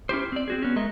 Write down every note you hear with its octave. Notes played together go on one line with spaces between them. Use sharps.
C#4 E4 G4 C5
C4 D5
C4 F#4 G#4
B3 C#4
G#3 A3 A#4 D#5 E5